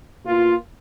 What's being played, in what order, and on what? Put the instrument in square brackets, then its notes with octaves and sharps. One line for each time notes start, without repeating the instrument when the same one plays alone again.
[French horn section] B2 A#3 F4